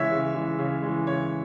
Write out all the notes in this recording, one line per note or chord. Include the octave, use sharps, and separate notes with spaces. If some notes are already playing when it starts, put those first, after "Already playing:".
Already playing: C#3 E3 G#3 C#5 E5
C#3
E3 G#3
C#3
E3 G#3
C#3 C#5